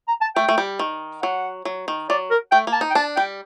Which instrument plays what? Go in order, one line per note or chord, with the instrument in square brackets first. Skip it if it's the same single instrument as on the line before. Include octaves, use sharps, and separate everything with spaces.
[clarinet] A#5
A5
[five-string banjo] A3 [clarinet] G5
[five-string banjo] A3
G3
D#3
[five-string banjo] F#3 [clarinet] F#5
[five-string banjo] F#3
D#3
[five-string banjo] F#3 [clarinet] D5
[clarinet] A#4
[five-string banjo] A3 [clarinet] G5
[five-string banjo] A#3
[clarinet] A5
[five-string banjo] D#4
[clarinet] G5
[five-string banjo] D4 [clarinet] A5
[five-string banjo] G3 [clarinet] G5